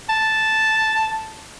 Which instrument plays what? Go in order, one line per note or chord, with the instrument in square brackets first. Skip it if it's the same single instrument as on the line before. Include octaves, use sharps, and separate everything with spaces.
[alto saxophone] A5